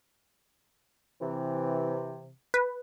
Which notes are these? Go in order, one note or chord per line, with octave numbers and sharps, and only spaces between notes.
C3 E3
B4